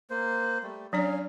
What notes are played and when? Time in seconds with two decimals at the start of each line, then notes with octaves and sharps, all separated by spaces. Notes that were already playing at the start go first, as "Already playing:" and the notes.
0.10 A#3 C5
0.63 G3 A3
0.93 F#3 C#4 D4 C#5 D5 F5